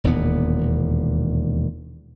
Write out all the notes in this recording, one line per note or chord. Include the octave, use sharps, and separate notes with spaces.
E1 D#2 A#2 B3